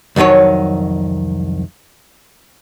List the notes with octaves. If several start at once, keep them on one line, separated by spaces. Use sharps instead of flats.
C2 F2 D#3 F#3 C#5